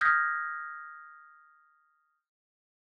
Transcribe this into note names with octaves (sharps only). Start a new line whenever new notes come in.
D#6 F6 G6 G#6 A#6 B6